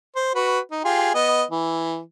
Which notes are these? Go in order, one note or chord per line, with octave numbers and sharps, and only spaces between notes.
C5
F#4 B4
D#4
F4 G4 G#4
B3 D#5
E3